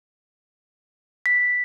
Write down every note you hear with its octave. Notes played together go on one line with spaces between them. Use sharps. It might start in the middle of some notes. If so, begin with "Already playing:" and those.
B6